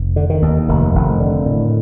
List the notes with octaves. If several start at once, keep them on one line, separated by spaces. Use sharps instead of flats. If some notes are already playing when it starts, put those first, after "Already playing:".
Already playing: F1
D3
D#3
D#2
F1 D#3
F1
D3
A2